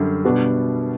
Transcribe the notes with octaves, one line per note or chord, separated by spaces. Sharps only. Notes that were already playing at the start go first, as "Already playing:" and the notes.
Already playing: F#2 D3 G3
B2 G3 B3 D4 F#4